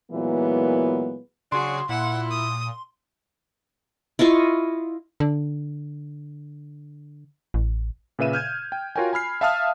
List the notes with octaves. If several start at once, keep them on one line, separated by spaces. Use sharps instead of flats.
A#2 E3 F#3 G#3 A#3 B3
C#3 F#3 D4 F#4 G#4 C6
A#2 E4 F#5
D#6
E4 F4 D#5 C#6
D3
A1
A#2 C#3 B4 E5 D#7 E7
F6 G6 G#6
G5
F4 F#4 A#4 C#5 G5 G#5
G#5 B5 F6 C7
E5 F5 A5 D#6 F6